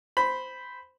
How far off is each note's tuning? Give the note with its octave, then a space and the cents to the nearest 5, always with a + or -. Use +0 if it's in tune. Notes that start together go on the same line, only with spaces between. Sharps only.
C5 -10 B5 +0